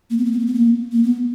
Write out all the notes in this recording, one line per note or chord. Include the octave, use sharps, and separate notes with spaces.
A#3
B3
A#3
B3
A#3
B3
A#3
A#3
B3